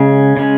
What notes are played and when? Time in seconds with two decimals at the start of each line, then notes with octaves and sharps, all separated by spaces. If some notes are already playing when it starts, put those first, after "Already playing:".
Already playing: C#3 G#3 C#4
0.37 C#3 G#3 C#4